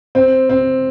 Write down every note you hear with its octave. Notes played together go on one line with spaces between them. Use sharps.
C4
C4